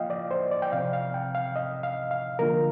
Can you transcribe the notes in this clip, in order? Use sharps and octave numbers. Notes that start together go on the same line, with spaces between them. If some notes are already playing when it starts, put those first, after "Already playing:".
Already playing: F3 A#3 F4 D#5 F5 G5
D5
C5
D5
G5
C3 F3 C4 F5
F5
G5
F5
D#5
F5
F5
D3 F3 A#3 D4 F4 A#4